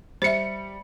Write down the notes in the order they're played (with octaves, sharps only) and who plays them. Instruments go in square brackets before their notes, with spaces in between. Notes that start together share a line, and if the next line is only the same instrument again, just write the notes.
[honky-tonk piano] G3 C#7 [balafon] C5 E5